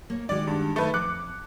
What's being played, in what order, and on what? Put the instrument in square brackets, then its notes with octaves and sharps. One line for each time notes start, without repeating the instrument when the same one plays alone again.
[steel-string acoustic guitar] A#3 C#5
[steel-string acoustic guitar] D#3 G#3 F#4 [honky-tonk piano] D5
[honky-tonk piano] G2
[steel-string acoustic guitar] D#3 G#3 D#4 [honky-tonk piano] A3 B4
[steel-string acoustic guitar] F2 [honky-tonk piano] D6 F#6 C#7